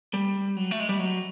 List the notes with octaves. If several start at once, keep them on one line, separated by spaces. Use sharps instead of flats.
G3
F#3
A3
G#3
G3
F#3